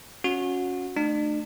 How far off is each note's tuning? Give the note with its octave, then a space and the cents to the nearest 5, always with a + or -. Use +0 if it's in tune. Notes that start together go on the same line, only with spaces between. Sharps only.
C#4 +0 F#4 -30
A3 +0 D4 +40